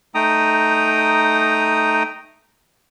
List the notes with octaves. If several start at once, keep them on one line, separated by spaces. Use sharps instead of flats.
A3 D#4 G5 A#5 D#6